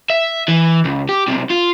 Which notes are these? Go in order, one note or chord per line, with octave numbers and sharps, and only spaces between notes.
E5
E3
C#2
G4
B1 C3
F4